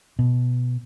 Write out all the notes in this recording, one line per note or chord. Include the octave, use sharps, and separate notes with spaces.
B2